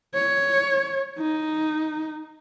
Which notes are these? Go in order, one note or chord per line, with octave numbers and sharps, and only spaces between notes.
C#5
D#4